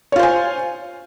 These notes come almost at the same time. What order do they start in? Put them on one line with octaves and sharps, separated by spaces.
C#5 F4 C5 G#5